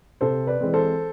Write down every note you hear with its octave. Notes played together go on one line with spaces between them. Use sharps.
C3 A4 C5
B4 D5
E3 G#3 C4
A4 C5